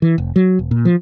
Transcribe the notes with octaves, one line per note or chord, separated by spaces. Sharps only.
E3
F1
F#3
E1
A#2
F3